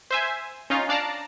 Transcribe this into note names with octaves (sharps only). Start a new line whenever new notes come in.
C5 E5 G#5
C#4 D#4 F4
D4 D5 F5 A5 A#5